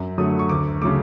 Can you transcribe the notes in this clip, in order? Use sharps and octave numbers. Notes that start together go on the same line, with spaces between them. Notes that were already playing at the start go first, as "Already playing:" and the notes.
Already playing: F#2
D3 F#3 A3 D#6
C#6
D2 D6
C#3 F#3 A3 D6